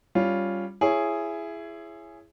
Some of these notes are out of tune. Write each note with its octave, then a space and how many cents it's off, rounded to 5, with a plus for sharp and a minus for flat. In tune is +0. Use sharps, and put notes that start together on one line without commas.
G3 +0 C#4 +0 F4 +0
E4 +20 G#4 +0 C#5 +0